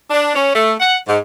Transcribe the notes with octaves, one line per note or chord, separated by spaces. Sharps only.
D4
C#4
A3
F#5
G#2